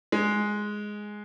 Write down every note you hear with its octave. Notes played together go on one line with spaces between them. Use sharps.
G#3